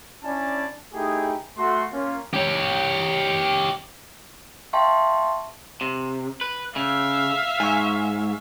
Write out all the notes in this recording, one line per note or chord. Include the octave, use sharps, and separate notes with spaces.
C#4 D4 E4 D5 G#5 A5
A3 D#4 E4 G4 G#4
A3 F#4 C6
A#3 C#4 F4
G4 C#5
E5 F5 G5 A5 C6 C#6
C3
B4
C#3 E5 F5
G#2 G#5 C#6